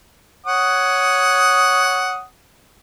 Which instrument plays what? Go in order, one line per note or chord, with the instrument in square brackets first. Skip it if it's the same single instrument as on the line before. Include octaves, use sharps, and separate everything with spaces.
[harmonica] C#5 F#5 D#6